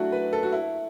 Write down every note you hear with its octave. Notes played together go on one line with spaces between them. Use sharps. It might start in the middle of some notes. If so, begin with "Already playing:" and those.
Already playing: F#3 A3 D4 E4 F#4
B4
A4
F#4
E4